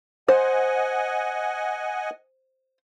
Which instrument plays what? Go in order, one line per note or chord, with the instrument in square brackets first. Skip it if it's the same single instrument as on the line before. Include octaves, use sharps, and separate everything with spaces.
[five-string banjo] C5 [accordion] D#5 F#5 G#5